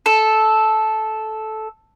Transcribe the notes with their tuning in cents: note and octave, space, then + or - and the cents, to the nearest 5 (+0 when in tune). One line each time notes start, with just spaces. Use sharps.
A4 -10